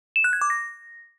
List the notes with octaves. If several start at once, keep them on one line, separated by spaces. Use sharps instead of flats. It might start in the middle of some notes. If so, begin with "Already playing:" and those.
E7
F#6
G#6
D6
A#6